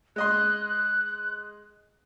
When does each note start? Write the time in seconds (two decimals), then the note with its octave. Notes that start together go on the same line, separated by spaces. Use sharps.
0.16 G#3 D#5 C6 F#6